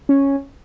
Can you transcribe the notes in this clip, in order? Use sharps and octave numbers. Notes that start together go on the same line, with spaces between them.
C#4